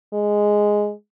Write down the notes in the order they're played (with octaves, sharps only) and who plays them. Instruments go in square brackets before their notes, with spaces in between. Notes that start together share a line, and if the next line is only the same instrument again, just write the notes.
[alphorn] G#3